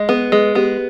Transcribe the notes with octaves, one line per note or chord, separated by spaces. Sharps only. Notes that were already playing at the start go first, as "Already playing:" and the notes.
Already playing: G#3 D#5
B3 G#4
G#3 G#4
B3 G4